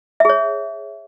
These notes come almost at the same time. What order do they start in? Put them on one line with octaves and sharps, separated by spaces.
E5 G#4 C#5